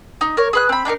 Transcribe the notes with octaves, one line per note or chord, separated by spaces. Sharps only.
D#4
A#4 C#5
G#4 B4 F#6
C4 B5
D4 D#4 G4 A#4